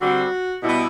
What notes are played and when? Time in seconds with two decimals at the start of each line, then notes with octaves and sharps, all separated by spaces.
0.01 D3 G3 C4 F#4
0.63 B2 G3 B3 E4